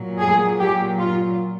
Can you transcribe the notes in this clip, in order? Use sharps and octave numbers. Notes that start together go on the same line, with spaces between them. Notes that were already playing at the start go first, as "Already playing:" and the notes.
Already playing: A#2 F#3
G#4
G4
F4